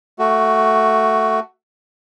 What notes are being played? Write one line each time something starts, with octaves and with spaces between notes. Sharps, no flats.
A3 F#4